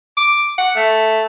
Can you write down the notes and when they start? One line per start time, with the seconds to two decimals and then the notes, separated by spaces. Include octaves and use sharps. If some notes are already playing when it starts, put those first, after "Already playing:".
0.17 D6
0.58 F#5
0.76 A3